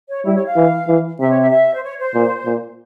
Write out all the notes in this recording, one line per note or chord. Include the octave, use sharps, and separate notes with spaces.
C#5
G3 E4
C#5
F5
E3
E3
C3 E5
C#5
E5
E5
C5
C#5
C5
A#2
A#2